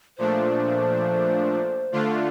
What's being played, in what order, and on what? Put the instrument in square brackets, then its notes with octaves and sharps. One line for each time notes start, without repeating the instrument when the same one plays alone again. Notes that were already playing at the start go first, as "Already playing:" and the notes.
[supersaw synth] A#2 F3 A3 D4 [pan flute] C5
[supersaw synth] D3 A3 D4 F4